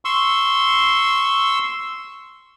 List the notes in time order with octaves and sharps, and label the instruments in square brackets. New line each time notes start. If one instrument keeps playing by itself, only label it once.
[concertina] C6 C#6 E6